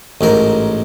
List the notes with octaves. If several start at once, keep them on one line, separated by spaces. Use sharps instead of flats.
A1 G#2 A#4